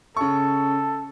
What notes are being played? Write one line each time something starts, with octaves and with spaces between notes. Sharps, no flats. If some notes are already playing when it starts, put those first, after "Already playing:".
C#3 A4 C#6